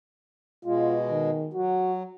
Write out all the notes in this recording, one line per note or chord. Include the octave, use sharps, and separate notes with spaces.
B2 G#3 F4
D#3
F#3 F#4